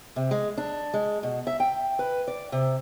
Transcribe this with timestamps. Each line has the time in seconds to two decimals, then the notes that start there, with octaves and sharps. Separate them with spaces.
0.16 C3
0.31 G#3
0.57 D4
0.94 G#3
1.23 B2
1.47 E5
1.60 G5
1.99 B4
2.28 D5
2.52 C3